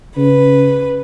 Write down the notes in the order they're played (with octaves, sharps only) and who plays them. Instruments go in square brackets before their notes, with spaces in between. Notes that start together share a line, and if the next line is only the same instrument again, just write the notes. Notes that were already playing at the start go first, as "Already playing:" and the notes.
[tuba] C#3 [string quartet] B4